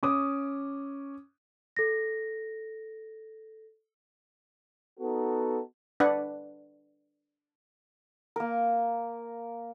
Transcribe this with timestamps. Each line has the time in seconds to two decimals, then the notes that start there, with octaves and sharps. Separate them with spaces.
0.03 C#4 D6 D#6
1.77 A4 A#6
5.00 B3 D#4 F#4 A4
6.00 D4 B4 F#5
8.36 A#3 A#4